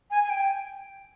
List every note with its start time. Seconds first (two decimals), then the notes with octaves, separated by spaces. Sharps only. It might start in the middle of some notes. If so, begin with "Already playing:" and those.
0.11 G#5
0.23 G#5
0.30 G5